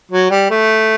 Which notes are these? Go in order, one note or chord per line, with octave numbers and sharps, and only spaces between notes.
F#3
G3
A3